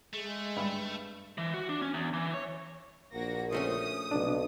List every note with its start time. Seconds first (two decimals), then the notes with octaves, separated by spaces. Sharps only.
0.14 G#3 A3
0.56 G2 B5
1.38 E3
1.54 F#4
1.69 D4
1.82 C#4
1.94 E2
2.14 E3
2.34 C#5
3.14 A#1 A#3 F#4 A#6
3.52 F3 A3 C#4 D#6
4.11 B1 C3 D4